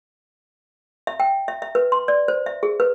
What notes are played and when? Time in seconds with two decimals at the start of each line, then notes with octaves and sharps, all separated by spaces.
1.07 E5
1.20 G5
1.48 E5
1.62 E5
1.75 B4
1.92 C6
2.08 D5
2.28 C5
2.46 E5
2.63 G#4
2.80 B4